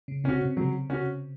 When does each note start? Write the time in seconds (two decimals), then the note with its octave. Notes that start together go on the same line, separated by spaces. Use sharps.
0.08 C#3
0.24 C3 C#4 F#4
0.41 C3
0.57 C#3 F#3
0.90 C#4 F#4